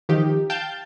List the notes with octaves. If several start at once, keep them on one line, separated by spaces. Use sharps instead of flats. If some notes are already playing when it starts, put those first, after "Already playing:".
D#3 F3 D#4 G4
F5 G5 A5 G6 A6